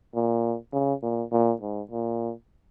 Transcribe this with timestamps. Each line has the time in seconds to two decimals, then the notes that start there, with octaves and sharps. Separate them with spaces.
0.15 A#2
0.73 C#3
1.03 A#2
1.32 A#2
1.61 G#2
1.91 A#2